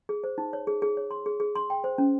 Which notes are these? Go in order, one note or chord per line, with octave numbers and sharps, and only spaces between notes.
G#4
C5
D#4
C#5
G#4
G#4
C#5
C6
G#4
G#4
C6
G5
C5
C#4